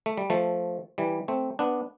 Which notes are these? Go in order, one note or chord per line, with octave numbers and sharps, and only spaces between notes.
A3
G3
F3 A3
E3 G3
A3 C4
B3 D4